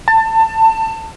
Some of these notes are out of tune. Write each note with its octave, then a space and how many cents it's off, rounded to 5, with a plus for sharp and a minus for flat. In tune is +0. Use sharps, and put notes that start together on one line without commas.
A5 +25